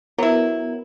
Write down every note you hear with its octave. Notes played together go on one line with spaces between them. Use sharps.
F#3 B3 E4 A#4